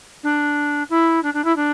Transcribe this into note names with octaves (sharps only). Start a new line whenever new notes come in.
D4
E4
D4
D4
E4
D4